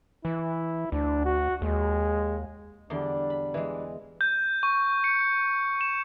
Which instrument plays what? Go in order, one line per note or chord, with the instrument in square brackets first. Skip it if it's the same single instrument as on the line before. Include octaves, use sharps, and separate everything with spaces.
[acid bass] E3 [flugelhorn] E4
[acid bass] D2 [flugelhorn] D4
[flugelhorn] F#4
[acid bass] D#2 [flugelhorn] G#3
[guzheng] E2 D3 C6 [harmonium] G3 D4
[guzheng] B5
E3 G#3
[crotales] G6
C#6
C#7
E7